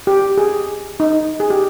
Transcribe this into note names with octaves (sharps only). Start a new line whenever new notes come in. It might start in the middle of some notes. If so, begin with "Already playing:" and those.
G4
G#4
D#4
G#4
G4